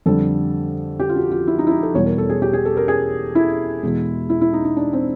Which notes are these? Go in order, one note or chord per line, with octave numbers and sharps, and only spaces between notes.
F2 D3 G3 A4
G4
F4
F#4
F4
E4
D#4
E4
D#4
A4
E2 B2 G3 C#5
A#4
A4
G#4
G4
G#4
A4
A#4
G#4
E4
E2 B2 G#3
E4
E4
D#4
D#4
D4
C4